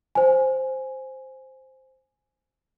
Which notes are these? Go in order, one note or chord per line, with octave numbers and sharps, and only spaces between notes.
C5 G#5